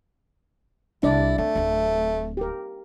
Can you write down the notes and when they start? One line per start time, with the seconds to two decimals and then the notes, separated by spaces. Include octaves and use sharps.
1.03 C2 D4 E4 D5
1.38 A3 C4
1.55 D1 C4
2.37 G4 A#4